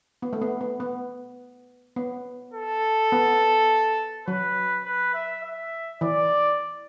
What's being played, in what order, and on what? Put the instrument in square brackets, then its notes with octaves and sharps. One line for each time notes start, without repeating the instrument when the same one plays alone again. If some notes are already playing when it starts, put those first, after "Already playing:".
[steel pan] B3
A3
B3
B3
B3
B3
[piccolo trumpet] A4
[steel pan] B3
[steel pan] F#3 [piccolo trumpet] B4
[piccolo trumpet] B4
E5
E5
[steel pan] E3 [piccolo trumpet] D5